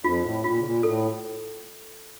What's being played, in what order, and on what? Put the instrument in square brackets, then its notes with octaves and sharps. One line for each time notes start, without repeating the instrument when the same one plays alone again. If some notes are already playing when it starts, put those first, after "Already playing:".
[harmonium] F2 [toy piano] F4
[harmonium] A2
[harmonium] A#2 [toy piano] F4
[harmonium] C#3
A#2
[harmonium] A2 [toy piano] A4